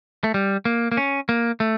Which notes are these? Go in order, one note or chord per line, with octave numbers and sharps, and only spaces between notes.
A3
G3
A#3
A#3
C#4
A#3
A3